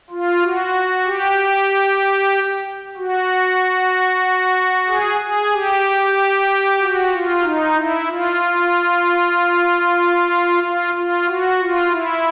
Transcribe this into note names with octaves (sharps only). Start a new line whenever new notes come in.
F4
F#4
G4
F#4
G#4
G#4
G4
F#4
F4
D#4
E4
F4
F4
F4
F#4
F4
E4